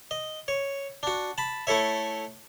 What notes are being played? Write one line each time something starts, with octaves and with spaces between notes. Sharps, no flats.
D#5
C#5
D4 F#4
A5 B5
A3 E4 A4 C#5 E5